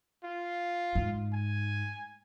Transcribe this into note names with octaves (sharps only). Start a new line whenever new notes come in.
F4
G#2
G#5